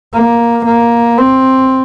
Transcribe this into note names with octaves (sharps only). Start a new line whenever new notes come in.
A#3
A#3
C4